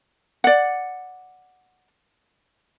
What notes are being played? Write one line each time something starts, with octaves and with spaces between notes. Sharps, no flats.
D5 F#5